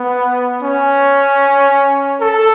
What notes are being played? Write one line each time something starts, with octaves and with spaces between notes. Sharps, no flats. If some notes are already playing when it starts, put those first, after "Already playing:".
Already playing: B3
C#4
A4